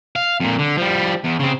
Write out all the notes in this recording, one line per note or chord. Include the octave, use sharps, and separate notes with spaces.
F5
F2 A#2
D3
F3 G3
E2
C#3 C4